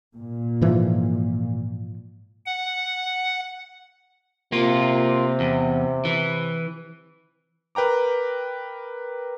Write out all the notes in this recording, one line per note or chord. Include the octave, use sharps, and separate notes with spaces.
A#2
G#2 E3 F3
F#5
C3 A#3 F4
E2
E3
A#4 B4 G5 A#5 D6